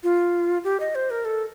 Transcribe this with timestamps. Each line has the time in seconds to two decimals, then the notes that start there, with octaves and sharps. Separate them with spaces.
0.03 F4
0.64 G4
0.80 D#5
0.95 C5
1.10 A#4
1.25 A4